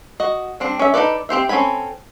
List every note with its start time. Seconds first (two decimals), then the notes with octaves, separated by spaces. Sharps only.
0.20 F#4 D#5
0.60 G3 C4 D4
0.79 C#4 E5
0.94 D#4 F#4 A4 B4 D5
1.29 C4 G4 C5 E5
1.49 C4 C#4 A4 G#5 B5